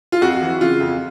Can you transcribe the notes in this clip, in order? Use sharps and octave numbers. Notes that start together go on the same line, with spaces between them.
F4
F2 F#4
E3
C#3 F4
F2